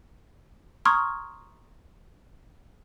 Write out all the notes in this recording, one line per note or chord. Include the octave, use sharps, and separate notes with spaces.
A#5 C6 C#6 D#6 F6 G#6